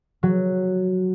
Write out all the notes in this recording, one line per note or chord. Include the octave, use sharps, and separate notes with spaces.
F#3